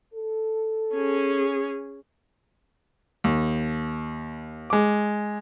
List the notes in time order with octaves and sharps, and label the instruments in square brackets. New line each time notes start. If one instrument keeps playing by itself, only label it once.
[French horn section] A4
[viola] C#4 G#4
[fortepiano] D#2
G#3 D6